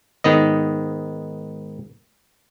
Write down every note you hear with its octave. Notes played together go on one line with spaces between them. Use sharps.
G#2 D#3 B3 D#5